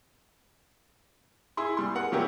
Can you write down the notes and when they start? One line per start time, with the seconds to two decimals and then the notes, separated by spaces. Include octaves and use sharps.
1.57 E4 G#4 C6
1.77 G3 C6
1.95 G#4 A#4 F#5
2.12 F3 F#3 E4 G4 G#4 A#4